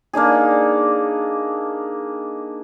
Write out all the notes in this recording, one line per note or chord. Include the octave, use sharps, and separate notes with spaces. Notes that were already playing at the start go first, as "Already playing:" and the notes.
A#3 D4 D#4 G#4